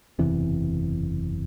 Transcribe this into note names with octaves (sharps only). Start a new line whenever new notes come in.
F#1 E2 C3 E3